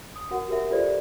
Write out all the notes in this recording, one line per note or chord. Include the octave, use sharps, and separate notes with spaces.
D#6
F#4 A#4 F#5
F#4 G4 A#4 E5
F4 G4 A4 C5 D5